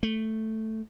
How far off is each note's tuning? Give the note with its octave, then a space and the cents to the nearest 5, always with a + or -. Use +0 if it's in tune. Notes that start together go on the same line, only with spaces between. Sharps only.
A3 +0